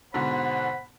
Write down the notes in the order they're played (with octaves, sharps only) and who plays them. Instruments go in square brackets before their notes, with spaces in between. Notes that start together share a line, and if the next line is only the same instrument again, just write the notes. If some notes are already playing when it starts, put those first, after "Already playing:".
[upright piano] G#2 B2 D3 [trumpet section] C5 F#5 [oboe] B5